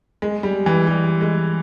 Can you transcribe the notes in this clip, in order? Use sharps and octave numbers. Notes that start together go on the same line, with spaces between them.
G#3
G3
E3
G3
G#3